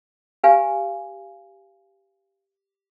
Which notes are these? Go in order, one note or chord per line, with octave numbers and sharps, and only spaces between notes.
G4 B4 F5 G#5